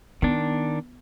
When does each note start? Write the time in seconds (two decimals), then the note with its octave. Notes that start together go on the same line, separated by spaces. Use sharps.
0.22 D#3 B3 D4